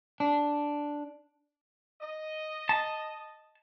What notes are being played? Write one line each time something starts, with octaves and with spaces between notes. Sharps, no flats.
D4
D#5
A5